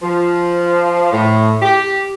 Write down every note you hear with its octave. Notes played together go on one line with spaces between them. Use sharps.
F3
A2
G4